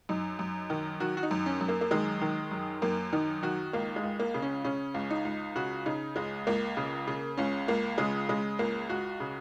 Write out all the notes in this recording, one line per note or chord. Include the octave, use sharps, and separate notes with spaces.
F#2 D#4
F#2
D#3
D#3 F#4
F#4
D#4
F#2
C#4
F#2
A#3
A#3
D#3 G#3
D#3
F#2
F#2 A#3
D#3 D#4
D#3 F#4
C#2 A#3
G#3
C#2
A#3
C#3
C#4
C#3 C#4
C#2
D#4
C#2
C#3 F#4
C#3 D#4
C#2 G#3
C#2 A#3
C#3
C#3
C#2 C#4
C#2 A#3
C#3 G#3
C#3 G#3
C#2 A#3
C#2 F#4
C#3